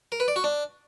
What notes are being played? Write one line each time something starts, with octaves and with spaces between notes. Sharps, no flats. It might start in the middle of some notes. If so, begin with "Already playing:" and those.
A#4
B4
D5
F#4
D4